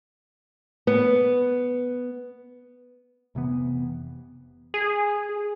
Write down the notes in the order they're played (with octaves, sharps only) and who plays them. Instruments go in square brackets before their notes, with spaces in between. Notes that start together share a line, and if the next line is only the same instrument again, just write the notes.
[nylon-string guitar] B3
[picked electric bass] F1 C3 E3 B3
[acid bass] G#4